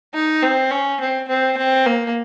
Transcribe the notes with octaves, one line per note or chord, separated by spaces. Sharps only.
D#4
C4
C#4
C4
C4
C4
A#3